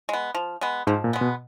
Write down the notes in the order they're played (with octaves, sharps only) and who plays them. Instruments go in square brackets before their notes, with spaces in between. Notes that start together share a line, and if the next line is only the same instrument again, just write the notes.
[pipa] G#3 B3
F3
G#3 B3
[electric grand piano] G#2 [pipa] F3
[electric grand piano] A#2
[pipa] G#3 B3
[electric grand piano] B2